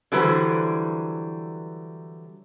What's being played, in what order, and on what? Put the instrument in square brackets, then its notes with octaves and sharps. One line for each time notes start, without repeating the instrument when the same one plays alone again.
[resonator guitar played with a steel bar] D3 E3 F#3 G3 B4 C5